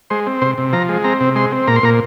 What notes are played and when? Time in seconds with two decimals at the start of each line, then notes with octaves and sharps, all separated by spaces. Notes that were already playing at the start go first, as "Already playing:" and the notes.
0.10 G#3 C5
0.27 C4
0.42 C3 C5
0.58 C3
0.73 F3 A#5
0.89 G#3
1.04 C4 A#5
1.21 C3
1.35 G#3 C6
1.52 C4
1.67 A#2 A#5
1.76 C6
1.83 A#2 A#5